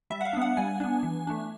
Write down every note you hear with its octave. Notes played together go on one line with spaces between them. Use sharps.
G3 E5
F#5
F5
B3 D4
F#5
G3 G#5
B3 D4
E3
A3 D4